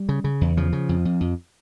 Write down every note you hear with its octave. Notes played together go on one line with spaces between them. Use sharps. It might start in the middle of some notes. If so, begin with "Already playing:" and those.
Already playing: G3
C#3
C#3
E2
C#3 F3
C#3
F2
F2
F2